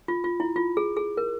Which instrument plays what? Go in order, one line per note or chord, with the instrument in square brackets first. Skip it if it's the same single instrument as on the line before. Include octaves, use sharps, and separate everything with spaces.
[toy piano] F4
F4
E4
F4
G#4
G#4
A#4